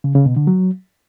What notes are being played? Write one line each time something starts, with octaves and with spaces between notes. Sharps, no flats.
C#3
C#3
B2
D3
F#3